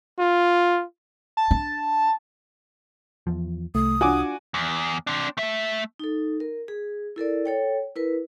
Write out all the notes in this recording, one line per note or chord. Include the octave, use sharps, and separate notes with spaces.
F4
A5
D4
E2 F3
C2 A3 D#6
D4 F4 F#4 G#5 D6
E2
C4 D4
A3 E5
D#4 A4
A#4
G#4
E4 A4 A#4 D5
A4 C#5 G5
E4 A#4 B4